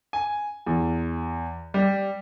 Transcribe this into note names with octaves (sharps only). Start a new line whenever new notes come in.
G#5
E2
G3